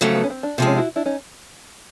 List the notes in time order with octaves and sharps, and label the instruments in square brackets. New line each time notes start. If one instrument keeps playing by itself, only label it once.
[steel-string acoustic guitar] F2 C#3 F#3 A3 [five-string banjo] C4
[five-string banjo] B3
C#4
C4
D4
[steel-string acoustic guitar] C3 F3 G#3 [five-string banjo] C4
[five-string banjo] C#4
E4 F#4
D4 E4
C#4 D#4